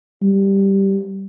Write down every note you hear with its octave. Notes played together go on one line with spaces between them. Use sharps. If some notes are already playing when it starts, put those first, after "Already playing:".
G3